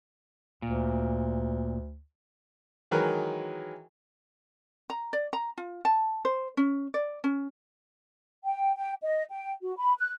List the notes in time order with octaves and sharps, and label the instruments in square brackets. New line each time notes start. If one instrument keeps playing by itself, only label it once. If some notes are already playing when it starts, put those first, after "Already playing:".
[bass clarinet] D2 [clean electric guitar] A#2
[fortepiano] D#3 E3 F#3 G#3 A#4 B4
[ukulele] A#5
D5
A#5
F4
A5
C5
C#4
D5
C#4
[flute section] G5
G5
D#5
G5
F#4
B5
F#6